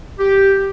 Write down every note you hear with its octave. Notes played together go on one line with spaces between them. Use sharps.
G4